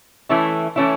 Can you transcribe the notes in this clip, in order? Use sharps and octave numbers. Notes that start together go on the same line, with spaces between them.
E3 A3 C#4 E4
E3 A3 C#4 E4